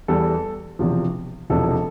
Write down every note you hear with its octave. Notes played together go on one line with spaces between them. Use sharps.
E2 E3 G3 A4
E1 E2 C3 F3
E1 E2 C3 F3 A4